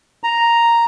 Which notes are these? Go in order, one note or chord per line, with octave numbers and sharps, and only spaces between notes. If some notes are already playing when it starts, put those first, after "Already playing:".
A#5